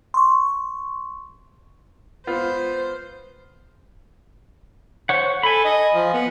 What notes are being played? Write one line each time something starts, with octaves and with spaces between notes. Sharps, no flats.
C6 C#6
B3 F4 C5
C5 C#5 F#5
A4 G#5 B5
D#5
F3
B3